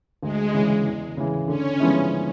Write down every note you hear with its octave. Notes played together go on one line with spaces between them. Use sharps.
D2 G#3
C#3 E3
E2
C#3 E3
D3 C#4
F3 G#3 B3 E4